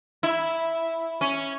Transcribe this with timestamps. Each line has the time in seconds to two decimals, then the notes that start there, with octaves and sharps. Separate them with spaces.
0.23 E4
1.21 C#4